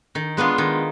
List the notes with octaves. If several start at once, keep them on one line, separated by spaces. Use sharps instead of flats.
D#3
G#3 B3 D4 F4
D#3